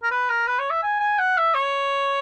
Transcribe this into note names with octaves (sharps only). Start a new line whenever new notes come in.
A#4
B4
A#4
B4
C#5
E5
G#5
G#5
F#5
E5
C#5